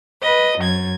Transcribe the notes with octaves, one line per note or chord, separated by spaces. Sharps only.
B4 D#5
F#2 G#6